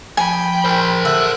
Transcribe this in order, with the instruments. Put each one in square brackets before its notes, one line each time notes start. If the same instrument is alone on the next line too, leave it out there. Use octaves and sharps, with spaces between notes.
[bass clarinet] F3 [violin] G5 B5 [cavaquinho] G#5
[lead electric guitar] A#4 C5
[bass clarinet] D3 [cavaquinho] E5 [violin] F#6